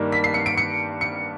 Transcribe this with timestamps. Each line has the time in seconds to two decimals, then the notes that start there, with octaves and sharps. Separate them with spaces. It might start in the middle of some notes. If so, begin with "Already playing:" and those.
Already playing: G2 D#3 G3 A#3
0.12 B6
0.24 C7
0.34 C#7
0.46 D7
0.57 C#7
1.01 C#7